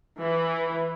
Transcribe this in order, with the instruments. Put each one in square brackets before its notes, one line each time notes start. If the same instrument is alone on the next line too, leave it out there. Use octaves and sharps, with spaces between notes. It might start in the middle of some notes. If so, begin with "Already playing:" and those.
[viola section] E3